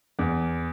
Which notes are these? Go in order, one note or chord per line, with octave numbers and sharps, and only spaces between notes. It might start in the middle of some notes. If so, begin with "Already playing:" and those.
E2